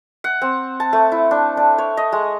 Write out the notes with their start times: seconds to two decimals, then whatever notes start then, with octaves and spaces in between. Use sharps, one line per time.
0.24 F#5
0.42 C4
0.80 A5
0.93 A3
1.12 E4
1.31 D4
1.57 D4
1.78 C#5
1.97 D#5
2.12 G#3